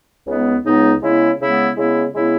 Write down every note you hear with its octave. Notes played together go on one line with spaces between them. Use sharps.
C#2 C#3 G#3 B3 D#4
C#2 C#3 G#3 B3 D#4
C#3 G#3 B3 E4
C#3 G#3 B3 E4
C#3 G#3 B3 E4
C#3 G#3 B3 E4